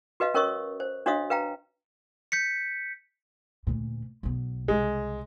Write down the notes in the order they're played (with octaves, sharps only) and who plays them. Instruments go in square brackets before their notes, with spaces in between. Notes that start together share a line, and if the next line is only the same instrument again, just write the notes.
[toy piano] F#4 B4 D#5 F5
C#4 A#4 C#5 D#5 C#6 D#6
C5
D4 F#4 C#5 D#5 F5 D#6
B4 F5 G5 A#5
[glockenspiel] G6 B6 C#7
[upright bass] D2 A#2
B1 B3
[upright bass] C2 C#3 [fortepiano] G#3